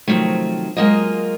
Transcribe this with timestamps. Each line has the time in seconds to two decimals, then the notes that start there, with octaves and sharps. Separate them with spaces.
0.08 C3 D#3 F3 F#3 A3
0.77 F#3 G#3 A#3 F4 A#4 D#5